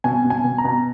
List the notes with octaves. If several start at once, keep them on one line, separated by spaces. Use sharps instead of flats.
B2 G#5
B2
G#5
B2
A#5
B2